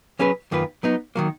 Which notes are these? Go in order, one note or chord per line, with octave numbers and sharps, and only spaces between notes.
F#3 C#4 G#4 B4
F#2 D#3 A#3 F4 B4
F#3 B3 D#4
D#3 F#3 A#3